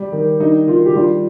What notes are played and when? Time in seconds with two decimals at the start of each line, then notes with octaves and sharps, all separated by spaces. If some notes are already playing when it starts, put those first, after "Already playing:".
Already playing: G3
0.12 D#3
0.40 G3 D#4
0.67 D#3 F4
0.86 G4
0.95 G3 F4